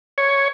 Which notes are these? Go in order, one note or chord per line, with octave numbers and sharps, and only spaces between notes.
C#5